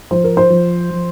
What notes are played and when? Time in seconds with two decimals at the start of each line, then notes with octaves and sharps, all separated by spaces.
0.11 F3 C5
0.24 A#4
0.37 C5
0.50 F3
0.91 F3